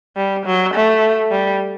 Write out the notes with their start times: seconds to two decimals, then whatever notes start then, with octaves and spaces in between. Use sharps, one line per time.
0.17 G3
0.46 F#3
0.74 A3
1.31 G3